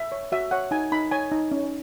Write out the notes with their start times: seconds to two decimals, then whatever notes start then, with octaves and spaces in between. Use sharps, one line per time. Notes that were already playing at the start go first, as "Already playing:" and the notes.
Already playing: E5
0.12 C#5
0.32 F#4 E5
0.51 C#5 F#5
0.71 D#4 G#5
0.92 D#4 B5
1.12 C#5 G#5
1.32 D#4
1.51 C#4